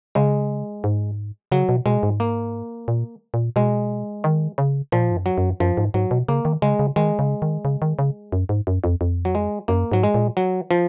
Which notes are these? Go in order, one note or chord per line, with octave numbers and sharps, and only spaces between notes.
C#3 G#3
G#2
C#3 F#3
B2
B2 G#3
G#2
A#3
A#2
A#2
B2 G#3
D#3
C#3
A#2 F3
G#2
F#2
F#3
F#2
F#2 F3
G#2
G#2 F#3
B2
C#3 A#3
D#3
C#3 G#3
C#3
D#3 G#3
C#3
D#3
C#3
D#3
C#3
F#2
G#2
F#2
F2
F2
F#3
G#3
F#2 A#3
G#2 F#3
G#3
A#2
F#3
F3